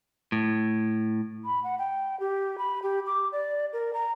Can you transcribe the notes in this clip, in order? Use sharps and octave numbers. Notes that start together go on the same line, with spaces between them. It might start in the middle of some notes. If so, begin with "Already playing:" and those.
A2
B5
F#5
G5
G4
B5
G4
D6
D5
A#4
A#5